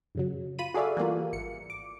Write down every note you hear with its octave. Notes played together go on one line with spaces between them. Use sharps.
F#2 C#3 F#3
F4 B5 D#7
F#4 G#4 A4 D5 E5 F5
E3 G3 A#3 F4
G#1 C#7
D6